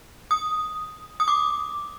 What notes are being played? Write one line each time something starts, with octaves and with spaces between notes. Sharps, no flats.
D#6
D#6
D6